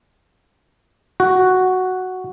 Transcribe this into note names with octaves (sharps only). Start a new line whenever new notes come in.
F#4